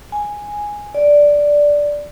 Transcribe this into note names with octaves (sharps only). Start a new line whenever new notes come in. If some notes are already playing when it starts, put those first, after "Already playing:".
G#5
D5